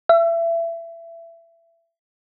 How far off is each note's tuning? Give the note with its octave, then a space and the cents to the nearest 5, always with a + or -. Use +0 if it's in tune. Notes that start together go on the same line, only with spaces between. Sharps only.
E5 +25